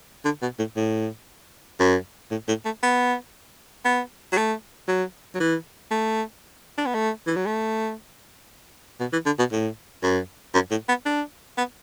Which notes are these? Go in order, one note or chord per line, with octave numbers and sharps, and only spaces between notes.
D3
B2
A2
A2
F#2
A2
A2
A3
B3
B3
F#3
A3
F#3
F#3
E3
A3
D4
B3
A3
E3
F#3
A3
B2
E3
D3
B2
A2
F#2
F#2
A2
B3
D4
B3